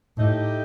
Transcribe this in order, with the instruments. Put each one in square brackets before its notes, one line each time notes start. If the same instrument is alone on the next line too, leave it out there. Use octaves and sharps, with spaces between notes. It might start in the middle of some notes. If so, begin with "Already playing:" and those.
[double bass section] A2 [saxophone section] A3 D#4 G4